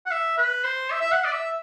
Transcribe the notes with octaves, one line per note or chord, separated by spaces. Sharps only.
F#5
E5
B4
C5
E5
E5
F#5
D5
E5